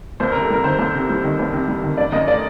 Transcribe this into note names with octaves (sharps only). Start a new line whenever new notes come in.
C2 C5
A#4
C3
A4
G3 A#4
D#3 C5
C2
C3
G3
D#3
C2
C3
G3
D#3
F#1 D5
F#2 D#5
A3 D5